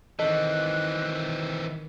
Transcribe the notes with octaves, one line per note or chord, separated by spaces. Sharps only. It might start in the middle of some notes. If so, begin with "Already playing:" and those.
D#3 E3 C4 A4 D#5 F#6